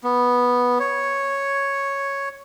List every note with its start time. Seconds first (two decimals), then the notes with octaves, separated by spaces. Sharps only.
0.04 B3
0.80 C#5